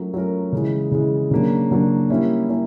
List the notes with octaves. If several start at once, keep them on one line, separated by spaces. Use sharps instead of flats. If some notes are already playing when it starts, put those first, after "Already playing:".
Already playing: F#3 A3 C#4 F4 A#4
F#3 A3 C#4 F4 A#4
C#3 E3 G#3
C#3 E3 G#3
C#3 F#3 A#3 D4
C#3 F#3 A#3 D4
G3 A#3 C#4 E4
A#3 C#4 E4